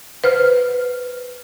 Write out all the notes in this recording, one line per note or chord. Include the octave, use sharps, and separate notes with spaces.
B4 C5 F6